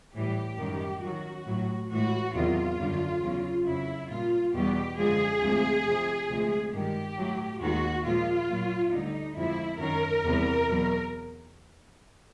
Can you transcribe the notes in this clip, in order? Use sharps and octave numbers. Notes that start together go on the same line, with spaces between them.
A2 E3 G3 G4
F#2 D#3 G3
F#2 D#3 F#3 F#4
A2 F#3
A2 E3 G#3 F#4
E2 C3 D#3 F#3 F4
F#2 D3 G3
E2 C#3 F#3
F2 C#3 F#3 E4
A#2 G3 F4
E2 B2 G3 G4
F#2 D3 F3 G#3 G#4
D2 C3 F3 G#3
F2 C3 F3
D2 C3 F3 G#3
G2 D#3 G#3 G4
A2 F#3
D#2 D#3 G#3 F#4
A#2 F3 G#3 F4
A#2 F#3
D2 D3 G3 D#4
F2 D3 F3 G#3 E4
F#2 D#3 F#3 A#4
E2 C3 E3 G3
E2 B2 F#3